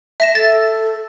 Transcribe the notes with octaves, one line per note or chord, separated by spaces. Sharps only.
E5 A#6 E7
A4 A6